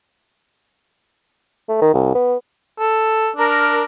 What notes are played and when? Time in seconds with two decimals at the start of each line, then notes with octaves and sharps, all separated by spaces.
1.69 A3
1.82 D#3
1.94 C2
2.15 B3
2.79 A4
3.37 D4 A#4